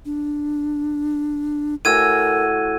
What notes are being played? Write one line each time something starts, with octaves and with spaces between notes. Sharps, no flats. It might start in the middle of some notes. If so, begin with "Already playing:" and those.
D4
A2 F#4 A#4 G#5 E6 G#6 D#7